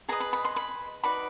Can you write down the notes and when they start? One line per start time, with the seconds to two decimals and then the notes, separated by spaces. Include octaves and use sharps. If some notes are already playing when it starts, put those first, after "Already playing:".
0.08 G#4 B4 D#5 A#5
0.20 B5
0.33 B5
0.45 C6
0.56 B5
1.04 D#4 F#4 B4 D5 B5